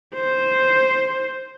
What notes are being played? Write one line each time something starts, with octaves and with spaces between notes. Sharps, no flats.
C5